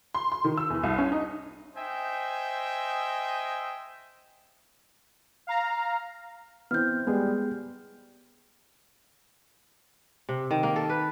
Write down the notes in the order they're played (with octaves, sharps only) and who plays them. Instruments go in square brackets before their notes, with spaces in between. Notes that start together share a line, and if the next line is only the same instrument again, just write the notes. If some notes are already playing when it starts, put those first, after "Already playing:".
[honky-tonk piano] C6
C6
D#3
E6
E2
C2
C#4
D#4
[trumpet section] C5 D#5 E5 G5 G#5
[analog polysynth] F5 A#5
[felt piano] E3 C4 [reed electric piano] B3 [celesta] F6 G6
[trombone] G3 [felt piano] G#3 [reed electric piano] B3 G#4
[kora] C3
D#3
A#3
A4
B4